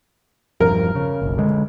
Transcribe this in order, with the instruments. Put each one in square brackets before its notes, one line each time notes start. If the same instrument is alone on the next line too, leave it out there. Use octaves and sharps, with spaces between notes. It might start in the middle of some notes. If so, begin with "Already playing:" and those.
[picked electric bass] E1 G2 F3 [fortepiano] A#4
[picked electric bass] C#3
F#1 B1
D3 G#3